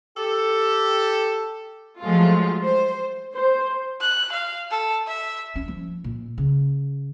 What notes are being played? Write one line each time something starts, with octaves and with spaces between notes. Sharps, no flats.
G4 A4
F3 F#3 G#3 A3 F4
C5
C5
F#6
F5
A4
E5
C#4
F3
A#2
C#3